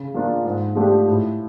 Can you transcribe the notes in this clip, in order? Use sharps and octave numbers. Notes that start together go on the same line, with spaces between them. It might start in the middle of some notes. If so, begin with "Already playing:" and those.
Already playing: C#3
F3 A#3 D4 F4
G#2
F3 A3 D4 G4
A2